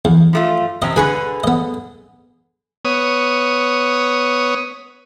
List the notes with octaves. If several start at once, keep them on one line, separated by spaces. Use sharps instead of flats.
E2
F3 A3 F4
C3 C4 C#4 D#5
D3 G#4 B4 G#5 B5 C#6
B3 D#5
B3 C#5 D#6